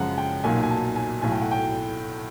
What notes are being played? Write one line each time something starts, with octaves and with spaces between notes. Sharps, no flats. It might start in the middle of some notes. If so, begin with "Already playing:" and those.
Already playing: F#2 C#3 F3 G#3 F#5 A#5
G5
B1 A#2 F#3 A#3 D#4 G#5
G#5
A5
G#5
B1 A2 F#3 G#5
G5
F#5
G5